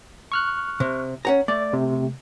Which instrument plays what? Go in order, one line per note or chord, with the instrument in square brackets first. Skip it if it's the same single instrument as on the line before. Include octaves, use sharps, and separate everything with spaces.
[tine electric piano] C#6 F6 F#6
[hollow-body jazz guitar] C3
C#4 F#5 A#5
[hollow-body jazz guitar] A3 [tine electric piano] D5
[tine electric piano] C3